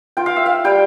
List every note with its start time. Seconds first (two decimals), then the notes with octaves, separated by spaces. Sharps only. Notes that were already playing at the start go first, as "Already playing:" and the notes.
0.17 F4 G5
0.26 F5
0.36 E5
0.46 F5
0.64 G3 G5